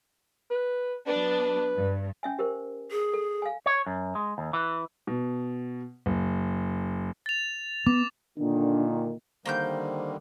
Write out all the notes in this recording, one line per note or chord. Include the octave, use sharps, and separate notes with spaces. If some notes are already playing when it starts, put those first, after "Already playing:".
B4
F#3 B3 D4 B4
G2
C#4 E5 G#5
G4 A#4 C5
G#4
A4
F5 G#5
C#5
F#2
G#3
D#2
E3
B2
F#1
A6 F7
B3 D6
A#2 D3 D#3 D4
D3 D#3 G3 A#3 C5 C6 G6